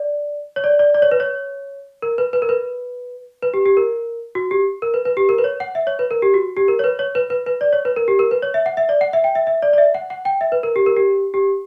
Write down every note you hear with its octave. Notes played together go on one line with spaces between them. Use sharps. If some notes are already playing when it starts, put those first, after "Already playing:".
Already playing: D5
C#5
D5
D5
D5
C#5
B4
C#5
A#4
B4
B4
A#4
B4
B4
G4
G4
A#4
F#4
G4
A#4
B4
B4
G4
A#4
B4
C#5
F#5
E5
C#5
B4
A#4
G4
F#4
G4
A#4
C#5
B4
C#5
B4
B4
B4
D5
C#5
B4
A#4
G4
A#4
B4
C#5
E5
F#5
E5
D5
F#5
E5
G5
E5
E5
D5
D5
E5
F#5
F#5
G5
E5
B4
A#4
G4
A#4
G4
G4